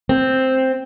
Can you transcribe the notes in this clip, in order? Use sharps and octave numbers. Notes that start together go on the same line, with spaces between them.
C4